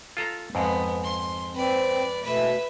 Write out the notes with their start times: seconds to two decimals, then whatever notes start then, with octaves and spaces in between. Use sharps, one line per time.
0.17 F4 A4 A#5
0.55 F2 G#2 B3
1.03 C6
1.54 C4 B4 D5
2.23 B2 A3 B4 E5